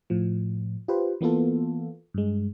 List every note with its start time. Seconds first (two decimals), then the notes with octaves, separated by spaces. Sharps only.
0.10 A2 F3
0.88 F4 G4 B4 C5
1.21 E3 A#3 B3 F4 A4
2.14 G2 G#3